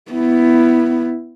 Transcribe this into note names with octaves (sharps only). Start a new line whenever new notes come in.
B3 E4